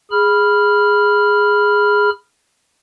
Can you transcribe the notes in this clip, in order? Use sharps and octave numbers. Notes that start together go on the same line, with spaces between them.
G#4 B5 F6